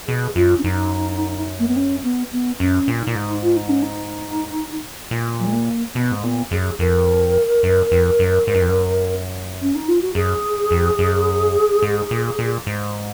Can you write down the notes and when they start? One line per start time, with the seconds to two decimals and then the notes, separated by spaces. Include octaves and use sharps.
0.07 B2 G#4
0.35 F#2 F4
0.59 C#4
0.64 F#2 D#4
1.59 A#3
1.68 B3
1.76 C#4
2.04 B3
2.32 B3
2.60 F#2 C#4
2.88 A#2
3.02 D#4
3.07 A#2
3.16 G#2
3.43 F4
3.56 D#4
3.69 C#4
3.83 D#4
5.11 A#2
5.40 F#3
5.47 G#3
5.53 A#3
5.95 B2 B3
6.11 G#2
6.23 A#2 B3
6.51 F#2 G#4
6.79 F2 A#4
7.63 F#2
7.91 F2
8.19 F#2
8.47 G#2
8.54 F#2
8.61 F2
8.69 F#2
9.62 C#4
9.75 D#4
9.88 F4
10.02 F#4
10.15 F#2 G#4
10.71 F2
10.99 F#2
11.82 G#2
12.11 A#2
12.39 A#2
12.66 G#2